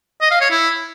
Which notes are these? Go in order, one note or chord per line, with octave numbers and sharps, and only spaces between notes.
D#5
F5
C#5
E4